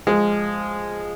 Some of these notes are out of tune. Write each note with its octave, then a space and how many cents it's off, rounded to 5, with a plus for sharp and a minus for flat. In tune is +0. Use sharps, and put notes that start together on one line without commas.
F3 +0 G#3 -5